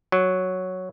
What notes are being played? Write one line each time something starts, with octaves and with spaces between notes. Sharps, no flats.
F#3